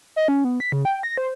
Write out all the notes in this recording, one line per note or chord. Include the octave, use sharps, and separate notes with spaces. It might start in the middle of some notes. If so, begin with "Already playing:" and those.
D#5
C#4
B3
B6
C#3
G5
A#6
C5